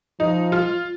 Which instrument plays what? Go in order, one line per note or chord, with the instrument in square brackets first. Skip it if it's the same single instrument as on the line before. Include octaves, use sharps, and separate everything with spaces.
[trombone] F3 [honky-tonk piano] D#4
[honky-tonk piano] F4